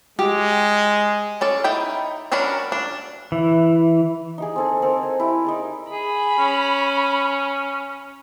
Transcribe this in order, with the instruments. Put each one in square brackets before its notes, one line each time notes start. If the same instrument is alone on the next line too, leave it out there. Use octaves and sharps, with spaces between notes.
[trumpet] G#3 [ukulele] G4
[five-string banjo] C#4 A4 D5
D#4 E4 G5 B5
F#3 C#4 D4 A#4 B5
D4
[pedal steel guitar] E3
[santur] D#4 G4 G#4
C4 A4 G#5
C4 A4 A#4
G#5
E4 G4
D#4 G#4 D5
[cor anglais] G#4 [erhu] B5
[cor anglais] C#4